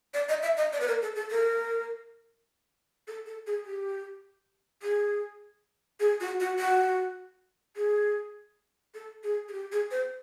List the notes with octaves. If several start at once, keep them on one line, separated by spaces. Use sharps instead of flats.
D5
D#5
E5
D#5
D5
B4
A#4
A4
A4
A#4
A4
A4
G#4
G4
G#4
G#4
F#4
F#4
F#4
G#4
A4
G#4
G#4
G4
G#4
C5